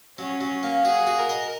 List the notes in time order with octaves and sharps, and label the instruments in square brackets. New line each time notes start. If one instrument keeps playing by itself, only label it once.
[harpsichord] F#3 [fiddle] C#4
[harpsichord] F#3
A#3
[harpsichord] F#4 [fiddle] G#4
[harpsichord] F#4
[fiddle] A#4
[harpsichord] D#5